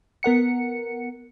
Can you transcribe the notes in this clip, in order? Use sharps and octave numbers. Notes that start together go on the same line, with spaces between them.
B3 A#4 F#5 C#7